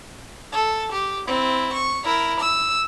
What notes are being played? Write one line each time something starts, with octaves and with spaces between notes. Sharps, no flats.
A4
G4
C4 E4
C#6
E4 A#4
E6